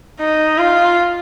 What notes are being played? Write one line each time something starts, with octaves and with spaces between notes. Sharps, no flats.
D#4
F4